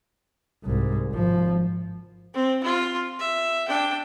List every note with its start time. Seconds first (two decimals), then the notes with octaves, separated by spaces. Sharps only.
0.63 C2 G#2
1.12 G#1 F3
2.34 C4
2.63 F4
3.19 E5
3.68 D4 G5